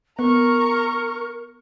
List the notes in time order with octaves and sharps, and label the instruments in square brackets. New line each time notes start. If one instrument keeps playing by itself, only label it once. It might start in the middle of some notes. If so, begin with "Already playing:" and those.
[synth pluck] B3 [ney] A#4 [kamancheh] A#5 C#6